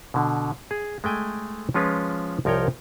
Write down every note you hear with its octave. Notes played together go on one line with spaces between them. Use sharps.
B2 D3
G#4
G#3 A3 G5 G#5
F3 G#3 C#4 F4 B4
C2 F3 A#4 C#5 G5